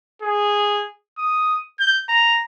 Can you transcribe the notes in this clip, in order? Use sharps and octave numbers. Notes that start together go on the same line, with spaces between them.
G#4
D#6
G6
A#5